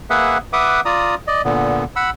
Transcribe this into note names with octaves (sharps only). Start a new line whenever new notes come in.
A#3 G#4 B4 E5 F#5
B4 E5 F#5 D6 D#6
F4 D5 A#5 D#6
D5 D#5
A#2 D3 B3
F#5 B5 E6